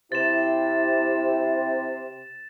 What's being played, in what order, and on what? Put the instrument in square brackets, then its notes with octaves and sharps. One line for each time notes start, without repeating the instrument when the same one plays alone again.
[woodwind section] C3 [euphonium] E4 [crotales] A6 E7